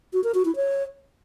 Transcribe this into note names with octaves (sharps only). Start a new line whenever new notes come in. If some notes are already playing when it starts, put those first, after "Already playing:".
F#4
A#4
F#4
E4
C#5